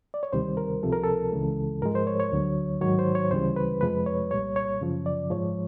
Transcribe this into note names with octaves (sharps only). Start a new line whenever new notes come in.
D5
C#5
D2 C3 D#3 G3 C5
A#4
C#2 C3 F3 A4
A#4
A4
C#2 C#3 E3 G#3
G#2 F3 G#3 A#4
C5
C#5
C#5
D2 D3 F#3
G#2 D#3 F#3 C#5
C5
C#5
D2 C#3 E3 G3 C5
B4
F2 C3 F3 G#3 B4
C#5
C2 A#2 G3 C#5
C#5
F#2 C#3 F3
D5
G#2 F3 G#3 C#5